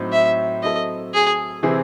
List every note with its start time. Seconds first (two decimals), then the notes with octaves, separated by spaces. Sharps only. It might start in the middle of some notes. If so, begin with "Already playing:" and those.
Already playing: A2 F#3 C4 D#4
0.12 E5
0.63 F#3 C4 E4 A4 D#5
1.14 G#4
1.63 C3 E3 C4 E4 G#4